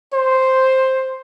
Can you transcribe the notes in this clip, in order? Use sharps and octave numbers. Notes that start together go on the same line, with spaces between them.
C5